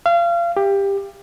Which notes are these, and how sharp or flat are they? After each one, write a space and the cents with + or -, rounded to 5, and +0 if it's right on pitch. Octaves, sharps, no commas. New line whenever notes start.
F5 -30
G4 +15